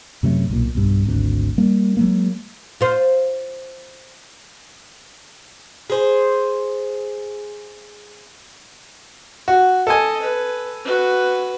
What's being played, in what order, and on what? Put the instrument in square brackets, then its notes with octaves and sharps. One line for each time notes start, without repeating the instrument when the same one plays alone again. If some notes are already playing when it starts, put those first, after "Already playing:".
[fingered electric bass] F#2 C3 F#3 A3
B1 A#2
B1 G2
G#1 D2
G3 A#3
F#3 G#3 A#3
[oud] F4 C5
[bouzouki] G#4 C5
[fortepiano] F#4
[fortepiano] A4 G#5 [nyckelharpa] D#5
[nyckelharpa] B4
F#4 B4